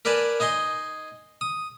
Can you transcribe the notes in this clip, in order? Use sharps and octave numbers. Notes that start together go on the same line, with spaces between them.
A#4 B4 D5 G#5 A5
D#4 D#5 G#5 C6
D#6